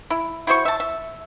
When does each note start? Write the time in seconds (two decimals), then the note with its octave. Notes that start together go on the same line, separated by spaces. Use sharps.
0.10 E4
0.47 E4 F#4 C5 C#6
0.65 E5 A5
0.80 E5